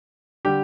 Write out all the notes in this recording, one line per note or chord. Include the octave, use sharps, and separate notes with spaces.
D3 G3 G4